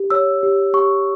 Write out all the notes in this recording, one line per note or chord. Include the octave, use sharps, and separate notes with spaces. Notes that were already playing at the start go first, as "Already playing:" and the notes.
Already playing: G4
C#5 E6
G4
G4 C#6